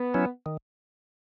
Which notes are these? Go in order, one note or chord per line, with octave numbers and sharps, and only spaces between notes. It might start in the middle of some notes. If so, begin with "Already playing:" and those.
Already playing: B3
F#3 C#4 E4
D#3